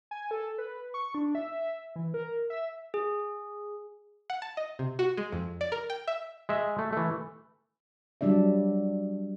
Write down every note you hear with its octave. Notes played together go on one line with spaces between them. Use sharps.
G#5
A4
B4
C#6
D4
E5
E3
A#4
E5
G#4
F#5
A5
D#5
C3
F#4
G#3
F2
D5
A#4
G5
E5
G#3 E5
A3
E3 A3
F#3 G3 D4 D5 E5